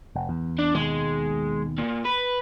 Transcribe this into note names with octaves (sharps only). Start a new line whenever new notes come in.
F1
E2
D4
D#2 B2 D#3 G#3
A#2
B4